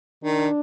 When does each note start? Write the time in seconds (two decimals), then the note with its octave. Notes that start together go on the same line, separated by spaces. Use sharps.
0.24 D#3 D4